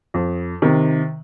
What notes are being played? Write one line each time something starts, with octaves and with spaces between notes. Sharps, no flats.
F2
C3 D#3